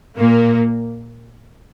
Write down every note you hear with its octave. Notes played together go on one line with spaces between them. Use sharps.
A#2 A#3